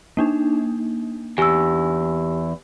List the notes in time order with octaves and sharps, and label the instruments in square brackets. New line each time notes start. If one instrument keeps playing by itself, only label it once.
[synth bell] A#3 D4 D#4
[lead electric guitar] E2 [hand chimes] G4 [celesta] G#5 E6